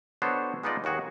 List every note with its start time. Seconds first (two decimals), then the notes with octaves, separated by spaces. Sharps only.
0.22 B3 D4 F#4 A4 C5 C#5
0.63 G#3 B3 D#4 F4 D5 D#5
0.84 D#2 A#3 F#4 G#4